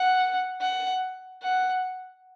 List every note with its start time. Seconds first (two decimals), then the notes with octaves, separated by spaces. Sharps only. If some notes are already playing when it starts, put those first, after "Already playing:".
Already playing: F#5
0.61 F#5
1.43 F#5